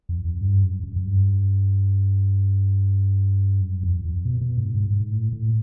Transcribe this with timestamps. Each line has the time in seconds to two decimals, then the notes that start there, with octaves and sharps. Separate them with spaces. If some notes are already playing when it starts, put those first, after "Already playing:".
0.09 F2
0.25 F2
0.41 G2
0.63 F#2
0.84 F#2
0.96 F#2
1.05 G2
3.61 F#2
3.83 F2
4.05 F2
4.25 B2
4.41 B2
4.57 G#2
4.74 G#2
4.90 G#2
5.11 A2
5.33 A2